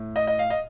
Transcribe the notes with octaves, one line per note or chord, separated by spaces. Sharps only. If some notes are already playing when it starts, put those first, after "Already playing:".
Already playing: A2
D#5
D#5
F5
D#5